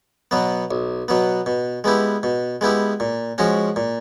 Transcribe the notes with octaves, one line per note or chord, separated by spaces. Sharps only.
B2 F#3 B3
B1
B2 F#3 B3
B2
G#3 B3 E4 G4
B2
G#3 B3 E4 G4
A#2
F3 G#3 C#4 F#4
A#2